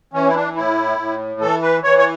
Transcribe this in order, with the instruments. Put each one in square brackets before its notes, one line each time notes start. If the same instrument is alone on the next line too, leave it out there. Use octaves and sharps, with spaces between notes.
[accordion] E3 C#4
E4
D4
A2 E4
A2
E3 A4
B4
E3 C#5
C#5